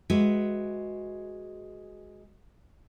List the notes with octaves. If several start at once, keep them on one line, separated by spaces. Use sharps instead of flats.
G#3 F#4 B4 E5